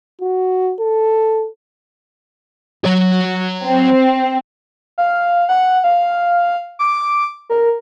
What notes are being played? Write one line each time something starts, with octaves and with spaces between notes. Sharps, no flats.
F#4
A4
F#3 C#5
C4
F5
F#5
F5
D6
A#4